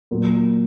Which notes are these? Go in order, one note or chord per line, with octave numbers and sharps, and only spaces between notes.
A#2 F#3 A#3